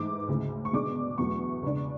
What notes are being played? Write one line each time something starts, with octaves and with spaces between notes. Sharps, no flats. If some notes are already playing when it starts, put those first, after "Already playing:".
Already playing: G#2 E3 A3 D6
D2 C#3 G#3
C#6
B2 G#3 D4 D6
E2 B2 F#3 A3 C#6
C#3 G#3 D4